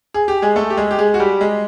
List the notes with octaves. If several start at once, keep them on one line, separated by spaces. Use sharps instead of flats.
G#4
G4
G#3 G#4
A3 A4
G4
G#3 G#4
G4
G#3 G#4
F#4
G3 G4
G#3 G#4